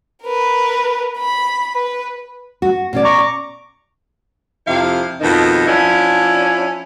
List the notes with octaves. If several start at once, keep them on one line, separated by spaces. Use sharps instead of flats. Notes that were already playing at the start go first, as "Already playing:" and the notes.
A#4 B4
B5
B4
F#4
B2 C#4 D5
A#5 C#6 D6
F2 C3 E4 F5
F2 B2 D#3 D#4
F3 C#4 D4 E4